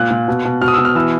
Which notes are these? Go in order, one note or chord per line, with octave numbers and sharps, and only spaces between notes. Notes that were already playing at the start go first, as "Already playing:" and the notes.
Already playing: A#2 F#6
A#2
B2
B2
B2 F6
D#6
E6
B2
F6
E3 E6